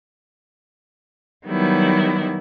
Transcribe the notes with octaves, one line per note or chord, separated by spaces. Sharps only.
D#3 F#3 G3 B3 E4